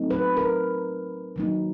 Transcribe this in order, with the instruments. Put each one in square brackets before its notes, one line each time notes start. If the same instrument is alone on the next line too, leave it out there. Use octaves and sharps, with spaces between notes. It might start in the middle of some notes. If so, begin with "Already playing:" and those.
Already playing: [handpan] F#3 A3 C4 D#4
B4
A#4
D#3 F#3 A#3 D#4